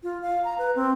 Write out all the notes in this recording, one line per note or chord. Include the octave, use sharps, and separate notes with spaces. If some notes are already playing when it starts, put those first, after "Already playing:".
F4
F5
A#5
B4
C4